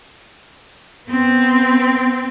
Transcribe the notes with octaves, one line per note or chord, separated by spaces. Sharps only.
B3 C4